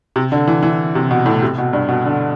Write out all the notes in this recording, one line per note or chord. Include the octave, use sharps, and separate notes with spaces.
C3
D3
E3
E3
C3
B2
A2
C3
B2
G2
B2
D3